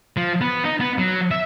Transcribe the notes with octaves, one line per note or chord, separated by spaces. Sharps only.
F3
B3
D#4
B3
F#3
E5